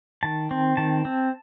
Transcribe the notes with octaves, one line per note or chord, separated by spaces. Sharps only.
D#3 A5
C4
D#3 A5
C4